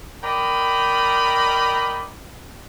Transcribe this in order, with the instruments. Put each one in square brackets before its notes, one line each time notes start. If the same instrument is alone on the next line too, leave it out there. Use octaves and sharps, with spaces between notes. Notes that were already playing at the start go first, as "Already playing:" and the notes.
[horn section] A#4 D5 D#5 G5 A#5 B5